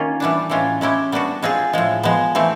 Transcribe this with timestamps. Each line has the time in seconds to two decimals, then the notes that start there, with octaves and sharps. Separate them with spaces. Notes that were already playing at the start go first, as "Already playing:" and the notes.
Already playing: D#3 A#3 C#4 F4
0.20 E3 G3 B3 D4
0.50 A2 E3 G#3 C#4 F4
0.81 G#3 C#4 E4 G4
1.12 G3 B3 D4 F#4
1.43 G#3 C4 F4 G#4
1.73 A2 F3 G#3
2.03 F3 G#3 B3
2.35 E3 A3 C4